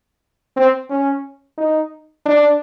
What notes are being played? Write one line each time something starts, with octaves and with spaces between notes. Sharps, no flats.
C4
C#4
D#4
D4